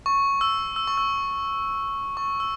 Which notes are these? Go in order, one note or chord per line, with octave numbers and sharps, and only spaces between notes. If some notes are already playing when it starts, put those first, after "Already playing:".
C#6
E6
E6
C#6
E6
C#6
E6